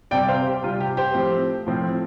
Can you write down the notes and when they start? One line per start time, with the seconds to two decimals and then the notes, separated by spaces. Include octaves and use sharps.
0.11 C3 G3 C4 D5 G5
0.28 C5 F5
0.47 G4
0.63 C3 G3 C4 F4
0.81 G4
0.97 G4 C5
1.15 A2 F3 C4
1.67 A2 F3 C4